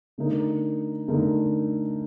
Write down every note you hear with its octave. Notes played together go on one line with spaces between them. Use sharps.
D3 A3 D#4 A#4
D3 A3 D#4 A#4